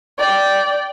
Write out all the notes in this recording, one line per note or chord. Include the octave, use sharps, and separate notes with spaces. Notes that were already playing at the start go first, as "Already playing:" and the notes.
D5 G5